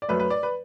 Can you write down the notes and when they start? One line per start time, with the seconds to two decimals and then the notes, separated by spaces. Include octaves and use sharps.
0.02 D5
0.08 F#2 F#3 A3 B4
0.20 B4
0.30 D5
0.43 B4